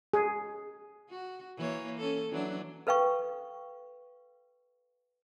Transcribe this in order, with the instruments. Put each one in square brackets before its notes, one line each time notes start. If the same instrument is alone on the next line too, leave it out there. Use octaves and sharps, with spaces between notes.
[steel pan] G#4
[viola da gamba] F#4
E3 A#3 C#5
C#4 A4
E3 F#3 D4
[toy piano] A4 B4 F5 G5 C#6